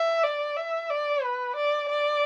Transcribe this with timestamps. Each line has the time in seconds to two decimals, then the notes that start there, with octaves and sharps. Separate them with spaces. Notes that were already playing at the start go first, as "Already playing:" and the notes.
Already playing: E5
0.24 D5
0.57 E5
0.90 D5
1.23 B4
1.56 D5
1.89 D5